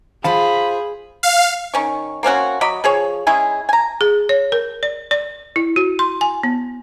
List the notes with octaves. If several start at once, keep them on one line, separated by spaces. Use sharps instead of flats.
F4 G#4 C5 D#5 F5 A5 B5
F5
D#3 C#4 C#6
A#3 C4 C#4 F#4
F#3 D5 D#5 B5
F3 G#4 C#5
G#3 C#4 E4 G#4
G#5 A#5
G#4
C#5
A#4
D5
D5
E4
F#4
C6
G#5
B3